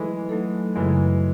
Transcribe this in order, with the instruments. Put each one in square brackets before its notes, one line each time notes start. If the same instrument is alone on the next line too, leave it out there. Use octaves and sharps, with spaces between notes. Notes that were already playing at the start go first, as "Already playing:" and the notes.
Already playing: [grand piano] E3 G#3 [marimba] F#3 A3 D#4 A4
[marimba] F#3 A3 D#4 A4
[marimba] F#2 C#3 F#3 [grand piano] E3 G#3